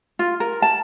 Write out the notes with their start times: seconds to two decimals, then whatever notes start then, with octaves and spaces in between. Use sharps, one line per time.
0.19 F4
0.40 A#4
0.62 A5